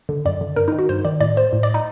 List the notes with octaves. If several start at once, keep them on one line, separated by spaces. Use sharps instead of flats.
D3
F#2 D5
D3
G2 A#4
D#4
D#3
F#4
G2 C5
D#3 D5
A2 D5
C5
A2
D5
D#4